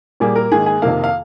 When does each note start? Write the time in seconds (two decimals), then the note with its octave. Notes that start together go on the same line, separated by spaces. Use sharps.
0.20 A#2 G3 A#3 G#4
0.36 A#4
0.52 G#2 D#3 A#3 G#4
0.66 G#4
0.82 F2 C3 D#3 A#3 F5
1.04 F5